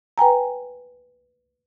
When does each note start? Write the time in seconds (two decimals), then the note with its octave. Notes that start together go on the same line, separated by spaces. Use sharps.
0.18 B4 G5 G#5 A#5